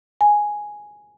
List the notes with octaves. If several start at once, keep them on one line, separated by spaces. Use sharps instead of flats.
G#5